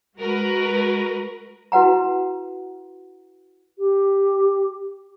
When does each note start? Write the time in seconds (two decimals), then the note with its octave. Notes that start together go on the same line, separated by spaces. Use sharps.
0.18 G#3 F#4 A#4 B4
1.72 E4 F#4 B4 F#5 A#5
3.79 G4